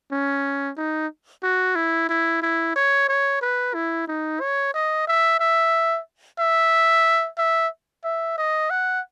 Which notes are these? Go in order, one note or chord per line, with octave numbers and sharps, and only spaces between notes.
C#4
D#4
F#4
E4
E4
E4
C#5
C#5
B4
E4
D#4
C#5
D#5
E5
E5
E5
E5
E5
D#5
F#5